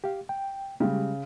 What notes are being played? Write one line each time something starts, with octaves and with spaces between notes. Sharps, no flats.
G4 F5
G5
C#3 G3 G#3 G4